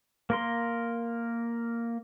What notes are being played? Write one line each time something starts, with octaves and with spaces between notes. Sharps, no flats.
A#3 A#4 C6